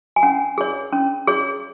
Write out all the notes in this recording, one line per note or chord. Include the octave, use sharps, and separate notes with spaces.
G#5
C#4 F#5
G#4 C#5
C#4
G#4 C#5